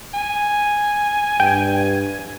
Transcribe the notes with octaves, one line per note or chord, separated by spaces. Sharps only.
G#5
G2 G5